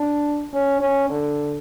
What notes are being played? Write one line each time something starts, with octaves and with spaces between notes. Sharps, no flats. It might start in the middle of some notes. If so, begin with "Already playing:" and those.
Already playing: D4
C#4
C#4
D3